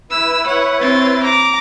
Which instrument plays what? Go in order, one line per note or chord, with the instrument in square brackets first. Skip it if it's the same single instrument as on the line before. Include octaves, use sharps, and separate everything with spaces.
[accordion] E4 B4 [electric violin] E6
[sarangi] C#5 [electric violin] F#5
[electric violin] C4 A6
[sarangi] A#5 [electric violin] D6